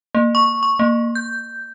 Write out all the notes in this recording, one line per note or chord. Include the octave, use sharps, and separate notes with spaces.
A#3
C#6
C#6
A#3
G6